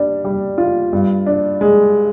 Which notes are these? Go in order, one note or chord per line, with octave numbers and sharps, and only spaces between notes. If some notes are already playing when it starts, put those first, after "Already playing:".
Already playing: G3 D4
G3
F4
G2
D4
G#3